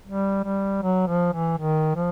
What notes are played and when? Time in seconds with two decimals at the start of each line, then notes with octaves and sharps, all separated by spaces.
0.07 G3
0.44 G3
0.82 F#3
1.07 F3
1.33 E3
1.58 D#3
1.95 F3